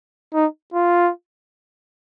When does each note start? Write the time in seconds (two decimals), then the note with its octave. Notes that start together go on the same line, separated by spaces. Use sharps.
0.34 D#4
0.74 F4